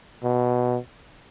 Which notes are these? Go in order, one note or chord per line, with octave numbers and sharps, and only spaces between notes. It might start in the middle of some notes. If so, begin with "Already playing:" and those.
B2